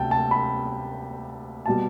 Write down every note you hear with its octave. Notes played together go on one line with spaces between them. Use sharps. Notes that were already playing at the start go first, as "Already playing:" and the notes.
Already playing: D2 C3 G5 A5
A5
B5
B2 G3 A5